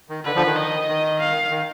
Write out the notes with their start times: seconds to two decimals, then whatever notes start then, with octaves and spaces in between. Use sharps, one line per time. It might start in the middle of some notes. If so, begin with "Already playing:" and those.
0.09 D#3
0.25 D3 B4
0.35 D3 F3
0.46 D#3
0.56 D#5
0.88 D#3
1.20 F5
1.51 D#3